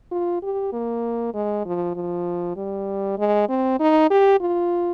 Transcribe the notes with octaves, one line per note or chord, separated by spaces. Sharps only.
F4
G4
A#3
G#3
F3
F3
G3
G#3
C4
D#4
G4
F4